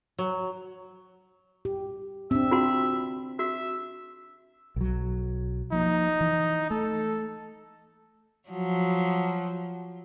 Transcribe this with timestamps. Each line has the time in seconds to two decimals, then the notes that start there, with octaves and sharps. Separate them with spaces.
0.19 F#3
1.65 G4
2.31 C4 D4 E5
2.51 F4 F#4 C6
3.39 F#4 E5
4.76 B1 F#3
5.72 F3 A#3 D#4
6.21 E3
6.71 A3 A4
8.49 F3 F#3